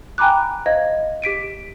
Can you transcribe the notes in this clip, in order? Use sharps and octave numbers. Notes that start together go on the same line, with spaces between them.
G5 G#5 A#5 B5 D6 F#6
C5 D#5 F5 G#6
G4 B6 D7 D#7